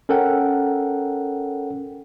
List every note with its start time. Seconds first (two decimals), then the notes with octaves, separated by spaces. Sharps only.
0.09 C#4 A4 A#4 F#5 G5